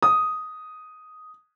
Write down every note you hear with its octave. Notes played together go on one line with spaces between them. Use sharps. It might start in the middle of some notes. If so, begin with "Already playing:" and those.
D#6